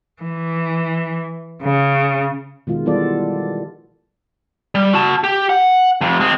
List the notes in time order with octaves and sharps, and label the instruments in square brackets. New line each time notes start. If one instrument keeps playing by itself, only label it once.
[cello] E3
C#3
[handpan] B2 D#3 G#3 F4
E3 G3 B3 F4 A4 D5
[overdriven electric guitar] G3
F#4 A5
G4
F#5
F2 C3
G#3 C4